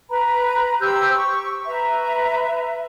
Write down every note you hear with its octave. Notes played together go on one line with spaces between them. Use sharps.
B4 A#5 B5
G4 C5 E6 G6
C#6
B4 E5 A#5